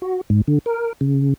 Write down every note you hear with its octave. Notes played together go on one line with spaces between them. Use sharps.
F#4
G#2
D3
A#4
C#3